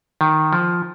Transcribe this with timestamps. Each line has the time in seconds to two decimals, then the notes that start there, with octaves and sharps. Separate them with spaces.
0.21 D#3
0.53 F3